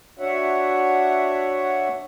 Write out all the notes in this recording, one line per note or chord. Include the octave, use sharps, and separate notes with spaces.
D4 F#4 C#5 E5 F#5